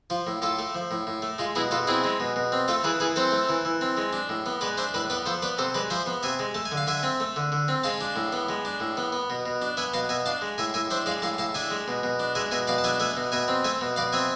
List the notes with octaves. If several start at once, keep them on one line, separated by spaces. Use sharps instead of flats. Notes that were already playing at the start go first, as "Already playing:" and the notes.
F3 F4
A2
A2 F4 A4
A3
F3
A2
A2
A3
G#3 F4
B2 E4 G#4
B2 F4 A4
C4 E4 G#4
G#3
B2
B2
C4
A3 F4 A4
E3 G#4 B4
E3 G#4 B4
C4 A4 C5
A3
E3
E3
C4
G#3
D4
A2
B3
G#3 B4 D5
D4 C5 E5
A2 B4 D5
B3 B4 D5
F3 A4 C5
B3 B4 D5
C3 A4 C5
G#3 B4 D5
F3 C5 E5
B3
C3 E5 G#5
G#3
A3 A5
G#5
D3
F5
D3 E5 G#5
C4
A3
D3
D3
C4
G#3 F5 A5
D4
A2
B3
G#3
D4
A2
B3
B3
B2
B2
D4
B3 E5 G#5
B2 F5 A5
B2 E5 G#5
D4 F5 A5
G#3
A2 E5 G#5
A2 E5 G#5
D4 C5 E5
G#3 D5 F5
A2 F5 A5
A2 F5 A5
D4 E5 G#5
G#3
B2
B2
D4
G#3 E5 G#5
B2 E5 G#5
B2 D5 F5
A5
D4 E5 G#5
A3 E5 G#5
B2
B2 E5 G#5
C4
A3 E5 G#5
B2
B2 D5 F5
C4 E5 G#5